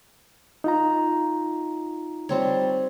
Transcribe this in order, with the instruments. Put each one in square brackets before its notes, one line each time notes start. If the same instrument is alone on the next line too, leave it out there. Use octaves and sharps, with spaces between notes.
[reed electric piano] D#4 F4 A#5
[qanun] G3 C4 C#5